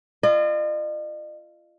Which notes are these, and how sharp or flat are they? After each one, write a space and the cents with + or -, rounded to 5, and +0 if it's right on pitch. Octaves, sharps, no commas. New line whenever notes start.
F4 -30 D#5 -45